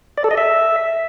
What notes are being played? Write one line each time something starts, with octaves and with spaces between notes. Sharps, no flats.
D5
A4
D#5
E5